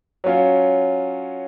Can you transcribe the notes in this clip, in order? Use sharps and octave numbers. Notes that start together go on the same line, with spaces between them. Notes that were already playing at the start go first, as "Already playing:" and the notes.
F#3 C#4 F4